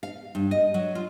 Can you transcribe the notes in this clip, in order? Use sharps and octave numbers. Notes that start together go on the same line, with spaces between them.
F5
G2
D#5
F#3
F4